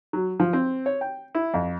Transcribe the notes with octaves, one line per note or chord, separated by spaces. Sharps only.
F#3
F3
C4
C#5
G5
E4
F2